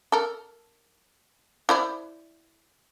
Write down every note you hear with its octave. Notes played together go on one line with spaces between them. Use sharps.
A4 A#4
E4 C5 D5